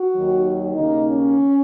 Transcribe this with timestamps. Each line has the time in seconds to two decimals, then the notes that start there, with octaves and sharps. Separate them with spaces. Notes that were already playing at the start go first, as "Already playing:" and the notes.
Already playing: F#4
0.15 D#2 D#3 F#3
0.76 D#2 C#3 A#3 D#4
1.07 C#4